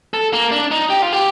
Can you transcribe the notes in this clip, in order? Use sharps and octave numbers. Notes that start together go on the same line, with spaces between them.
A4
A#3
D4
D#4
G4
F4
G4